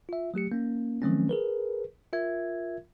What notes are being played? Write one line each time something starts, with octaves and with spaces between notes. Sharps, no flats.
F4 E5
F#3 A3 G4 C#7
A#3 C#4
D#3 F3 F#3 A3 C4 C#4
G#4 A#4 B4
F4 A#4 E5 G#6